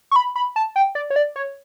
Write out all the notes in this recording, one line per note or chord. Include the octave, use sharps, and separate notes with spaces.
C#6
B5
B5
A5
G5
D5
C#5
D5
C#5